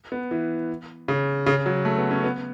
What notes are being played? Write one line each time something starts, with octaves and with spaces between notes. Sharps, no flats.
B3
E3
C#3
C#3
F#3
A3
B3
C#4
B3